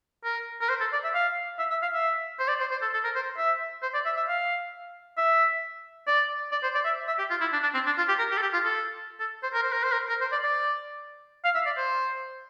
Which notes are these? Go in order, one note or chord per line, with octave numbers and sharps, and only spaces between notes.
A#4
A#4
C5
A4
D5
E5
F5
E5
E5
F5
E5
C5
D5
C5
C5
A4
A4
A#4
C5
E5
C5
D5
E5
E5
F5
E5
D5
D5
C5
D5
E5
E5
G4
F4
E4
D4
D4
C4
D4
F4
G4
A#4
G4
A4
G4
F4
A4
A4
C5
A#4
C5
A#4
C5
A#4
A#4
C5
D5
D5
F5
E5
D5
C5